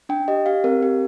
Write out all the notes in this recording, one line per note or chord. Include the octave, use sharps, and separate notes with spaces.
D4 G5
G4 D#5
G4 F5
C4 A#4
G4